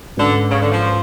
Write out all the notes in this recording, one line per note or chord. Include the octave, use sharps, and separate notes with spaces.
G#2 D3 G#3 C#4 F#4 B4
C#3
D3
F3